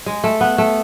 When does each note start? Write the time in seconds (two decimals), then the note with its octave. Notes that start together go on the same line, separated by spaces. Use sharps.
0.06 G#3
0.24 A3
0.41 B3
0.58 A3